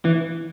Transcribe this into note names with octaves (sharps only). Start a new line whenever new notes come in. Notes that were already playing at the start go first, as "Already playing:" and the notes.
E3